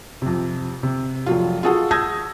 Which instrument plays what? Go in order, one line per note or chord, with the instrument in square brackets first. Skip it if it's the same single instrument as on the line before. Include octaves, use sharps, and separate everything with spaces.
[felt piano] F2 C3
C3
F1 F#3 F4
F4 F#4 G#4 A4 F#5
A5 D#6 E6 G6 G#6 A#6